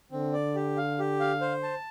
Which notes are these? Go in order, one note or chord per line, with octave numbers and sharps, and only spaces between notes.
D3 C4
D5
G4
F5
G4
F5
C5
A5